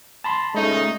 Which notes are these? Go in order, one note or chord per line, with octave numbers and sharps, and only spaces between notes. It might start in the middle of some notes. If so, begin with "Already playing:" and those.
A5 B5 C6
A#2 C#3 G#3 A3 D#4